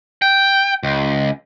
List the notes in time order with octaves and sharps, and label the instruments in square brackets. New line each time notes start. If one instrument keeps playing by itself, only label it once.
[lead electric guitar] G5
C#2